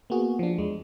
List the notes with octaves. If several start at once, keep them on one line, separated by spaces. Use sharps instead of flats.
A#3 B3 F#4 G#4
F3 D4
E2 G#3